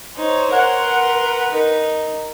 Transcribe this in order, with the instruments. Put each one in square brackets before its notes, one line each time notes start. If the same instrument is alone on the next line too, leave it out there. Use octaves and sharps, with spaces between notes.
[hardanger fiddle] D#4 [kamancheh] C5 C#5
[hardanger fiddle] A#4 C6 [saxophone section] F#5
[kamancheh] B4
[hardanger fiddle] D#4 [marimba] A#4